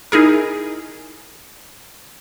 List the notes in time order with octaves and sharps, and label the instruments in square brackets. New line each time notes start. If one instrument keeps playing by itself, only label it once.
[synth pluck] D#4 E4 G#4 A#4